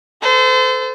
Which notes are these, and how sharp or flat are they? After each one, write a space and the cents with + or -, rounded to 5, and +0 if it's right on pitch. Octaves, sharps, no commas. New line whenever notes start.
A4 +0 C5 -35